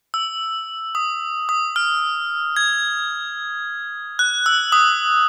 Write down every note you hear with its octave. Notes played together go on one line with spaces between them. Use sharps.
E6
D#6
D#6
F6
G#6
F#6
E6
D#6